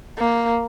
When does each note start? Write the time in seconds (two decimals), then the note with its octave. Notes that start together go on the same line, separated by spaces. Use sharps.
0.18 A#3